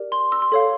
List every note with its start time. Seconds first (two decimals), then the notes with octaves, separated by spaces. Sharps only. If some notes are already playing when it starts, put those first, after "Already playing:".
Already playing: G4 A#4 D5
0.12 C6
0.32 E6
0.42 C6
0.52 A4 C#5 F5